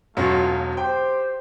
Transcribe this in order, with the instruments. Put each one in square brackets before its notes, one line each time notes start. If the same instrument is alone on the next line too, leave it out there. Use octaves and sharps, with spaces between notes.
[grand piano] E1 F#3 B3 [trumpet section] A3 C#4 F4
[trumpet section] G4 C5 [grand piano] G5